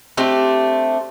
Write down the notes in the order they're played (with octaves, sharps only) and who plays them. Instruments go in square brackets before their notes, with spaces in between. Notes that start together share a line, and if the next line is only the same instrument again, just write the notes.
[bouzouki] A3 C4 D4 G4